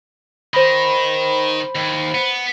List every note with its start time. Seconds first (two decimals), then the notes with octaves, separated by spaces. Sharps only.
0.54 D#3 C5 B5
1.76 D#2
2.15 B3